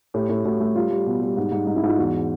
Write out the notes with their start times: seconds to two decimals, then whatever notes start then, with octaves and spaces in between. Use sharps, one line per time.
0.14 A2 G4
0.29 A2
0.44 A2 F#4
0.60 A3
0.75 G3 F4
0.91 G3
1.06 B2
1.21 G3
1.37 G#2
1.52 G#2
1.65 G#2 D#4
1.76 E4
1.83 G#2 F4
1.98 E2 F#4